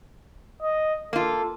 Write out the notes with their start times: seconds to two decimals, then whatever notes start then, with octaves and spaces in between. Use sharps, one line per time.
0.62 D#5
1.13 A#3 F4 A4